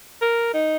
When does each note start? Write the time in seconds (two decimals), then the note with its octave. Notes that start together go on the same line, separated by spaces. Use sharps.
0.21 A#4
0.54 D#4